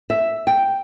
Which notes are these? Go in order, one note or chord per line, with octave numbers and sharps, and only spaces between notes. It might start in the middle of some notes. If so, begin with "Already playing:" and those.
E5
G5